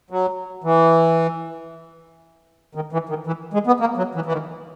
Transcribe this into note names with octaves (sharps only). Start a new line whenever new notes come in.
F#3
E3
D#3
E3
D#3
E3
G#3
B3
A#3
F#3
E3
E3
D#3